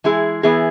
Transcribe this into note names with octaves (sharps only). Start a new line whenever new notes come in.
E3 G#3 E4 G#4
E3 B3 E4 G#4